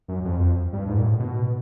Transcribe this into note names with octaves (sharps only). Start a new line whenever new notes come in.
F#2
F2
F2
G2
G#2
A#2
A2
B2